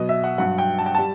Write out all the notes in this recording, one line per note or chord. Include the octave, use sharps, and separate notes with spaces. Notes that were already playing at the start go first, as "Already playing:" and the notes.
Already playing: B2 F#3 B4 D#5
E5
F#5
G2 F#3 F#5
G5
A5
G5
G3 A5